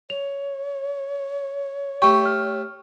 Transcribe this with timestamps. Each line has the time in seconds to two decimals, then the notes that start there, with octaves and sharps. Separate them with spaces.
0.10 C#5 F7
2.02 A3 G4 C#6
2.25 F6